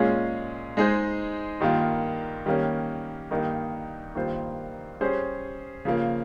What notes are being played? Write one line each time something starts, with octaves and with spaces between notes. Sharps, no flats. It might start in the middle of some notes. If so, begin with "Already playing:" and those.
Already playing: A#2 G#3 C#4 F4 G#4
G#3 D#4 G#4 C5
G2 D#3 A#3 F4
D#3 G3 A#3 C#4
G2 D#3 A#3 D#4
G2 D#3 A#3 F4 C5
G3 C#4 G#4 C5
C#3 F3 A#3